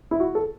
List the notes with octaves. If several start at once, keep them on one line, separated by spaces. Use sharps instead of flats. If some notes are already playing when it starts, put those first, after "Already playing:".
E4
F#4
A4